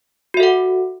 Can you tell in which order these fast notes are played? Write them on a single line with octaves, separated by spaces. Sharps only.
F#4 E5 A4 F#5